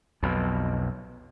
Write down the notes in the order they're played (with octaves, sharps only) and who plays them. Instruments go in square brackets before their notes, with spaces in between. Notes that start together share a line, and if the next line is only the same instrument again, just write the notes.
[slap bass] B1 F2 B2